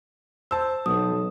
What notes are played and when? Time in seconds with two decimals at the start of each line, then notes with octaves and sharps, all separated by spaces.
0.51 C5 A5 E6
0.86 B1 F#3 D#6